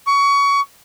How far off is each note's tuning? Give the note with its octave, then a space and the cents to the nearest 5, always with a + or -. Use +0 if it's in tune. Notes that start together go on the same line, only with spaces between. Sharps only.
C#6 +25